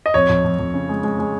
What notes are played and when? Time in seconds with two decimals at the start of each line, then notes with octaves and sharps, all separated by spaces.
0.06 D#5
0.14 F2 C#5
0.29 F2
0.44 F2
0.59 F2
0.74 C#3
0.89 G#3
1.04 G#3
1.19 G#3